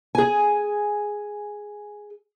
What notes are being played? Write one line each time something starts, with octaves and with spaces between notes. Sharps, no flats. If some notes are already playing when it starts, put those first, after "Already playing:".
G#4 G#5